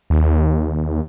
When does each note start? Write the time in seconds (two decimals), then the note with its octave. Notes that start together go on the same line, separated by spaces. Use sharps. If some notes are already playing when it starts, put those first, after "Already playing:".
0.10 D#2